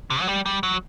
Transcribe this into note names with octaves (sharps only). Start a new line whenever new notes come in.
C3
F#3
G3
G3
F#3